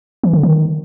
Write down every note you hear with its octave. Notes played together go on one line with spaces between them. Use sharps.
E3
D3
D#3